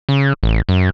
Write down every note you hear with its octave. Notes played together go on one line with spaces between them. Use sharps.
C#3
A1
F#2